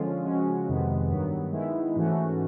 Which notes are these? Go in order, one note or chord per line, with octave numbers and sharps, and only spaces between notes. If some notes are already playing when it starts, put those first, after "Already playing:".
Already playing: D3 F3 G#3 C#4 F4
C#3 F3 G#3 C#4 F#4
F2 C3 D#3 G#3 B3
G2 D#3 F#3 B3
D#3 G#3 B3 E4
G#2 E3 A3 C#4 F#4